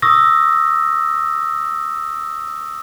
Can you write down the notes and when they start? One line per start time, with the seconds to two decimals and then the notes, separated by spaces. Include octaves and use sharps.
0.02 C#6 D#6 E6 A#6